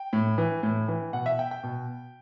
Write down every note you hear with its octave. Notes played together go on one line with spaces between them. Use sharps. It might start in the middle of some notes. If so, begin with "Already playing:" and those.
Already playing: G5
A2
E3
A2
E3
B2 F#5
E5
G5
G5
B2